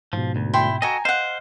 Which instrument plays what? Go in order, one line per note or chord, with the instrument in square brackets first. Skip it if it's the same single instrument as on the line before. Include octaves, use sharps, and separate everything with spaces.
[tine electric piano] G#2 B2 [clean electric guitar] F3
[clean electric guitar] D2
[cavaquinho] E4 G5 C6
[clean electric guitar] F#4 A4 D#5 [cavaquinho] G#5 A#5
[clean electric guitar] C5 [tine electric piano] D#5 [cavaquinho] F5 F#5